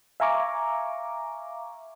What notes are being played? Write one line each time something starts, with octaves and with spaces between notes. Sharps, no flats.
E5 F5 G#5 A#5 C#6 D6